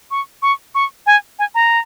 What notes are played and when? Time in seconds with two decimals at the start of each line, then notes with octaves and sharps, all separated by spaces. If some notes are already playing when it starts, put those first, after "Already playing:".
0.11 C#6
0.42 C#6
0.75 C#6
1.06 G#5
1.39 G#5
1.55 A#5